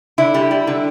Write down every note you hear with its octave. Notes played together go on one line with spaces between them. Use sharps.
D3 E4
G3
G3
D3